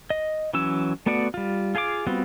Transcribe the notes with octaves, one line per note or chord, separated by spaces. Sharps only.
D#5
E3 F#3 C#4 E6
A3 B3 F#4 D5 F#5
G3 F4
F4 G#4 F5 G5 D6
G3 B3 C4 F4 F#4